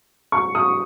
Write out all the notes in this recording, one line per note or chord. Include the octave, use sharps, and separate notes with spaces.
C#6
D#6